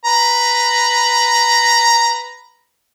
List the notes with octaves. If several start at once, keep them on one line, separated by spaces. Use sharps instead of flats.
B4 A#5